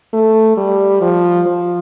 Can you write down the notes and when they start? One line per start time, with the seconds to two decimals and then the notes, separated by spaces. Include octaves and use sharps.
0.13 A3
0.57 G3
1.01 F3
1.46 F3